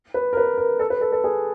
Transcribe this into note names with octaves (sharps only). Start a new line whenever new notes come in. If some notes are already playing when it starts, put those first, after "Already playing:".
B4
A#4
B4
A#4
A4
B4
A4
A4
G#4